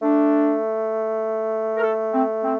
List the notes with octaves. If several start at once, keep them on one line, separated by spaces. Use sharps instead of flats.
A3 D4
A#4
A4
C4
C4